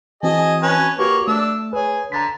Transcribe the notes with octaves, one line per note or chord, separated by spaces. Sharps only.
E3 C4 F#4 G#4 D#5 A5
C#4 B4 A5
A#3 F#4 G4 B4 C#5
A3 D4 E6
G#4 B4 C#5
D3 A#5 A6 B6